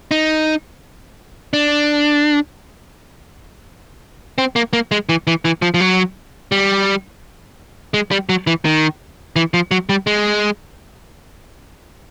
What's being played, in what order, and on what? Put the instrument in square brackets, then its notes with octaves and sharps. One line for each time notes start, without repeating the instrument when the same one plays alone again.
[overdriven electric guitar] D#4
D4
C4
A#3
A#3
G#3
E3
E3
E3
F3
F3
F#3
G3
G#3
G3
F#3
E3
D#3
E3
F3
F#3
G3
G#3